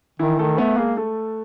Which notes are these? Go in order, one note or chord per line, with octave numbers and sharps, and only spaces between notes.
D#3 E3 E4
D#3 A3 A4
A3 B3 B4
G#3 A#3 G#4
A3 A4